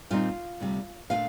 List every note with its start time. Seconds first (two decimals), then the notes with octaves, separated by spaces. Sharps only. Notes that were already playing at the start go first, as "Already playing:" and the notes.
0.11 A#2 G3 C4 D#4 F4 F5
0.61 D2 C3 G3
1.10 A#2 A3 D4 F4 F5